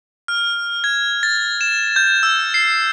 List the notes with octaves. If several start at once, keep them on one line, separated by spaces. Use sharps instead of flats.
F6
G#6
A6
E7
G6
E6
C7